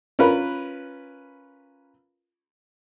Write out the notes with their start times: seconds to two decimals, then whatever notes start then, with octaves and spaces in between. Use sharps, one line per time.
0.19 C#4 F4 A#4 B4